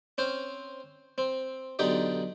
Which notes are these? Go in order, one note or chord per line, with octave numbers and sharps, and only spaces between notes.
C4 C#4 C5
C4
B1 D3 D#4 G4 D5